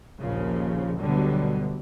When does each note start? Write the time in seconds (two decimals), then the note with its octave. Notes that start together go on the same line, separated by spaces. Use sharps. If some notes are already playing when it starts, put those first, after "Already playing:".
0.19 A#1 D#2 C#3 F3
0.99 D2 B2 D3 F#3 G3